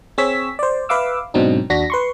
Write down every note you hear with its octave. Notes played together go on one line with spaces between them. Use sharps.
C4 G#4 C#5 E6 B6
C5 D5
B4 E5 F5 D6 E6
G#2 B2 F#3 C4 D4 D#4
D#2 D4 F#4 A#6 B6
B4 C6 C#6